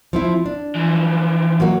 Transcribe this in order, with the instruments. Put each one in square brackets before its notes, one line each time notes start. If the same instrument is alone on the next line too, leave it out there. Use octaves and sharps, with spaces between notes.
[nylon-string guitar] F3 C4 E4
D4
[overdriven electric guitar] E3 F3
[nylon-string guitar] F#3 A#3 F#4